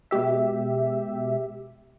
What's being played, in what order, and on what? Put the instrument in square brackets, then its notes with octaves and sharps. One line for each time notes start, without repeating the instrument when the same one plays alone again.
[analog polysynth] B2 G#3 G4 E5